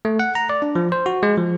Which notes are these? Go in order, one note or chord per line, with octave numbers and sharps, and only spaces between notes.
A3
F#5
A#5
D5
D4
F3
C5
F#4
G#3
F3